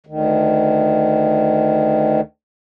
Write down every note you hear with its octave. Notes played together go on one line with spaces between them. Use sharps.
D2 D#3